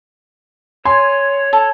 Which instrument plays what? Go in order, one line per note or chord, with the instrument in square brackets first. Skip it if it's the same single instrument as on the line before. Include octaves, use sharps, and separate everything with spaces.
[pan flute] C#5 [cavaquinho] G#5 [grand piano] C6
[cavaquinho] A4